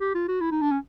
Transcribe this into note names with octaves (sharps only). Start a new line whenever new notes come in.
G4
F4
F#4
E4
D#4
D4
C#4